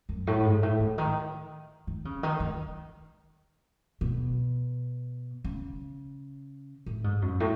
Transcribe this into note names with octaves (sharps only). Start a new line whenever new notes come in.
F#2
A2
G#2
A2
C#3
D#3
D#3
C#3
D#3
D#3
B2
C#3
A2
G#2
F#2
A2